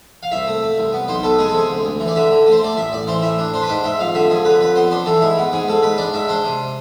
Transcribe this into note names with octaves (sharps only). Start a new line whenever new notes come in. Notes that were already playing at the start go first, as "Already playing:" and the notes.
F5
C2 E5
A3
A3
C2
B3
B1 C5
B3 A4
G#3 G#4
A4
C3 G#4
D2
D2
E3
D5
D3 E5
D3
A3
C5
A3 D5
A1 E5
A1 D5
E3 C5
A2 E5
D4
D4 C5
B4
G#2 C5
G#2 E5
F2 F5
D3 E5
F2 G#4
D3 B4
F2 B4
B3 C5
D4 C5
E3 A4
G#2 E4
B3
G#2 G#4
G#2 A4
G#2 B4
D4 D5
G#2 E5
D4 C5
C3